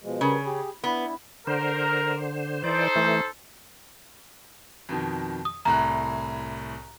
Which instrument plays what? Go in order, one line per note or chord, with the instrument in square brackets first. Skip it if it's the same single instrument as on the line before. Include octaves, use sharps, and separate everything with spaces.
[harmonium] B2 F3 G#3
[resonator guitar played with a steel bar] C#3 [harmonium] G3 A#4 B4
[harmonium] G4 G#4
[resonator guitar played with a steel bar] B3 [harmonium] D4 E4
[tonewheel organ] D3 C5 [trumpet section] A#4
[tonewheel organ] E3 D5 [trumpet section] D#4 A4 C5
[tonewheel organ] E3 A3
[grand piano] F2 B2 D#3
[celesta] D#6
[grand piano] C2 A2 F#6 [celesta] A#5